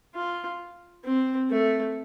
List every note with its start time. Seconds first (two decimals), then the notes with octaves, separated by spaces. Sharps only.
0.15 F4
1.04 C4
1.50 A3